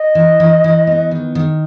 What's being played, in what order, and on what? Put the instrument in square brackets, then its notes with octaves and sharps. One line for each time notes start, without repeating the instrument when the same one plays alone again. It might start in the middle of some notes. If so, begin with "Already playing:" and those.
Already playing: [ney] D#5
[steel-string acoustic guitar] E3
E3
E3
B3
D#3
D#3